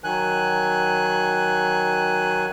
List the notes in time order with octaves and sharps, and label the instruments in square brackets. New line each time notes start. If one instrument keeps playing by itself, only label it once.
[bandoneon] D#3 F#3 G#5 F#6